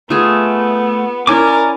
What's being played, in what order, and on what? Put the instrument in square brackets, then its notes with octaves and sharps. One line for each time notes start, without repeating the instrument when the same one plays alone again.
[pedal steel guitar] A3 [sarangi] B3 [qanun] F4 G#4 G#5
[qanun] C#4 E4 [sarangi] A#4 [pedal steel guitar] D5 G#5 D6